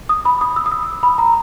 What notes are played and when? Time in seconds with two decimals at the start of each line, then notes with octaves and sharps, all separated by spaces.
0.09 D#6
0.25 B5
0.41 D#6
0.56 E6
0.66 D#6
0.72 E6
1.03 B5
1.18 A#5